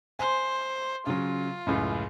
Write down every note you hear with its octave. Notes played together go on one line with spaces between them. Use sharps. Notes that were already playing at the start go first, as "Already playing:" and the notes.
C5 G#5
C#3 F#3 F4
C#2 F#2 A2